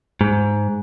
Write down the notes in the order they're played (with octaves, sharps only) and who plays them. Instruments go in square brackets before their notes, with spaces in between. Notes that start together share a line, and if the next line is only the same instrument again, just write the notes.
[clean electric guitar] G#2